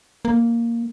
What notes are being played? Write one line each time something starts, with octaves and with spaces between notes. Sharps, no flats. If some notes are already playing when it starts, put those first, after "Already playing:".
A#3